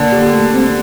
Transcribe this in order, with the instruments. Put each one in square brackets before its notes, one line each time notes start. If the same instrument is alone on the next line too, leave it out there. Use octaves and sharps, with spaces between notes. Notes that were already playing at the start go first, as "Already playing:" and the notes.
Already playing: [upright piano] D3 [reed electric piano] A#3
[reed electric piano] G4
A3
C4